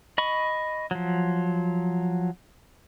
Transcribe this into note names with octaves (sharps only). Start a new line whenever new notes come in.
D#5 B5 C#6
F3 F#3